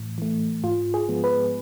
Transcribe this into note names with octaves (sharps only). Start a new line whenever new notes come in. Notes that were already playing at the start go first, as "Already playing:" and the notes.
Already playing: A2 E3
E3 A3
G#2 F4
G#4
F3 G#3 B3
B4